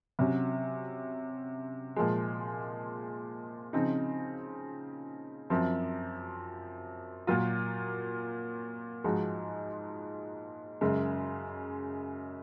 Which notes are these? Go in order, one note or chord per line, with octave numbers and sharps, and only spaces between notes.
C3 F#3 C#4 F#4
A#2 F3 G#3
C#3 F3 C4 D#4
F#2 F3 C4
A#2 F#3 A#3 F4
G#2 F3 G#3 D#4 F#4
F#2 C#3 G#3